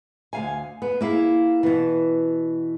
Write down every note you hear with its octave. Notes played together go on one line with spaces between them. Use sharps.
D2 F5 G#5
B3
A#3 E4 G#4 F5
B2 E3